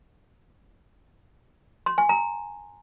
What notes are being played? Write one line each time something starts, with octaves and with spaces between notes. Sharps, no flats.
C6
G#5
A#5